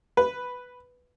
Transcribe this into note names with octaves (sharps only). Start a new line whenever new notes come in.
B4